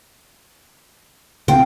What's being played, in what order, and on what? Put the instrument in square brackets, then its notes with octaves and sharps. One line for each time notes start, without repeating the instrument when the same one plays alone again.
[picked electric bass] C#3 A#3 C4 [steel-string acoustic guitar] F4 G5